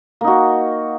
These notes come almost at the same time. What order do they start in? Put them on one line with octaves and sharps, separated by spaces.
A#3 D#4 F#4